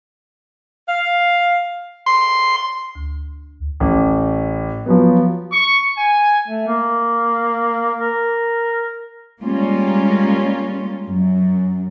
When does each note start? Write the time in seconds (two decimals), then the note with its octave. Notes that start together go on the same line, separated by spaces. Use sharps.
0.89 F5
2.06 C6
2.95 D2
3.80 A1
4.86 F3 F#3 B3
5.52 C#6
5.96 G#5
6.47 A3
6.68 A#3
8.00 A#4
9.42 G3 G#3 A#3 C#4 F4
11.05 F#2